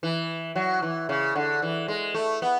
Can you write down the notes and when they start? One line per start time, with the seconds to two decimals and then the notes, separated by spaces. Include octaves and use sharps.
0.03 E3
0.56 F#3
0.82 E3
1.09 C#3
1.36 D3
1.62 E3
1.88 G#3
2.14 A3
2.42 B3